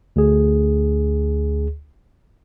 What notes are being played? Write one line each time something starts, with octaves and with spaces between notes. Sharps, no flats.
D2 G#4